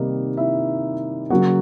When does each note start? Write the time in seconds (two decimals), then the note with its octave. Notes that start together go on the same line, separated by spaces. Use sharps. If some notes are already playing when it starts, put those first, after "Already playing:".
Already playing: C3 D#3 G3 A#3 D#4
0.37 E4 E5
1.30 C#3 F#3 A#3 F#4 F#5